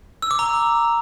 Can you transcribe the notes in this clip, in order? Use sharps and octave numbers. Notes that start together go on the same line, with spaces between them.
E6
D6
A#5